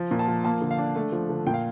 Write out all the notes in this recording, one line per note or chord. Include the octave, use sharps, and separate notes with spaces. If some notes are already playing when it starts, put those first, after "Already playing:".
Already playing: F3
A#2
A5
F3
A#3 A5
D3
F5
D4
A3
F3
D3
A#2 G5
F5